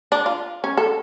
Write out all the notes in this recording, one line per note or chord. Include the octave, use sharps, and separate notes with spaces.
D4
F4
C#4
A4